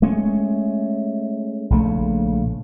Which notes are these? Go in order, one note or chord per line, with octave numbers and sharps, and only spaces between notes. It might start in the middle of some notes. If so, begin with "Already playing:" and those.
G#3 A3 C#4
A#1 C#3 A3